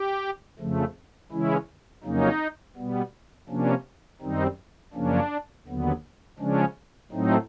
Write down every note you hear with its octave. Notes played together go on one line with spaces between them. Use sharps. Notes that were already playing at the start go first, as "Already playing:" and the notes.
Already playing: G4
F2 C#3 F3 A3
C#3 E3 G#3 C#4 E4
F2 C#3 F#3 A#3 C#4 D#4
B2 G3 B3
C3 F3 A#3 C#4 D4
F#2 D#3 G3 C4 D#4
F#2 C#3 F3 A#3 C#4 D4
D#2 D3 F#3 B3
C#3 F3 G#3 C#4 D4
A2 F#3 A3 C4 D#4